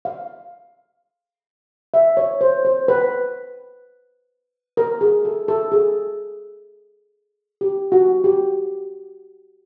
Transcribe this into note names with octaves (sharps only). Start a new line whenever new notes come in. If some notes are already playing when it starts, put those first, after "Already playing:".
F5
E5
C#5
C5
C5
B4
A#4
G#4
A4
A4
G#4
G4
F#4
G4